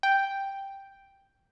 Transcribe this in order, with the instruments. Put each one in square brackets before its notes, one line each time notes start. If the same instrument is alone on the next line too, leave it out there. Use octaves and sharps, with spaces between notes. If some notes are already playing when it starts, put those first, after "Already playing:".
[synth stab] G5